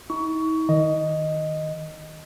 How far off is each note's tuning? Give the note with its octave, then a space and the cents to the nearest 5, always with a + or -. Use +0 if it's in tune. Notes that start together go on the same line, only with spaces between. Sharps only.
D#4 +45 C#6 +20
D#3 +0 D#5 +0